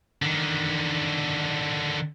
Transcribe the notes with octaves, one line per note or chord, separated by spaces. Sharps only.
D3 D#3